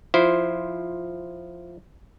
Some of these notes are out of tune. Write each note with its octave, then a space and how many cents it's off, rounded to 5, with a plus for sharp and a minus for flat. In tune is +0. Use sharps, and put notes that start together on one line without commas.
F3 +0 E4 +0 C5 +0